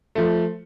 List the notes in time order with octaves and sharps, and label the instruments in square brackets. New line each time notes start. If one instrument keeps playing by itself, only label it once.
[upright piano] F3 A3